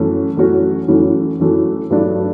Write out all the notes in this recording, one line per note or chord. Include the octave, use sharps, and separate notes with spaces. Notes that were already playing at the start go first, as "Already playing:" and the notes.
Already playing: F#2 E3 A3 C#4 F#4
F#2 E3 A3 C#4 F#4
F#2 E3 A3 C#4 F#4
F#2 E3 A3 C#4 F#4
G2 F#3 A3 D4